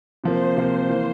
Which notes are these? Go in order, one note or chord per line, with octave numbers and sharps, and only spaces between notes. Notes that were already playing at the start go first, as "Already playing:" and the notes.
C3 F3 A#3 C5
C3 F3 A#3
E3 A#3